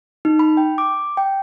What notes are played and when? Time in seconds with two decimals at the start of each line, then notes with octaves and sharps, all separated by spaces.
0.25 D#4
0.39 B5
0.57 G5
0.78 D6
1.17 G5